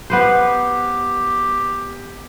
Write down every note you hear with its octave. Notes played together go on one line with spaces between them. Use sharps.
B3 G4 B4 C5